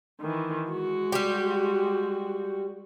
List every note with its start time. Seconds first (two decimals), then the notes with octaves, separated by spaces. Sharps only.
0.20 D#3 E3
0.71 G#3 F#4
1.12 G3 G4